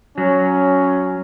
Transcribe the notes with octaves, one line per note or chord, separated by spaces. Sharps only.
F#3 C#4